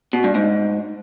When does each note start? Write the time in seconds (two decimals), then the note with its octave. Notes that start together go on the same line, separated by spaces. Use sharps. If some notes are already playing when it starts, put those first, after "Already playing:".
0.13 B2
0.24 G2
0.35 G#2